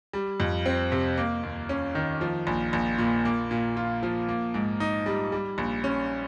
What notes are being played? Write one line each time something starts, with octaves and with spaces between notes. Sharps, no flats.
G3
F2
C4
C3
A#3
D#2
C#4
D#3
F3
A#1
A#1
A#2
A#3
A#2
F4
F3
A#3
G#2
D#4
G3
G3
A#1
C#4